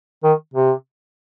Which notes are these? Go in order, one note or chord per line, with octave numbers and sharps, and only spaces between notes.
D#3
C3